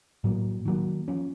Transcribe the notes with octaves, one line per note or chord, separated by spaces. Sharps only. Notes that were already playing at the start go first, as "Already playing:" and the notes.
A2 F#3 A#3
D#3 F#3 A#3
F3 A#3 C#4